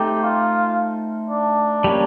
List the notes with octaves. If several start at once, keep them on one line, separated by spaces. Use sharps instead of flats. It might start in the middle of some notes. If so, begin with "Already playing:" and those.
Already playing: A3 C4 D#4 G4
F4
D4
G3 A#3 C#4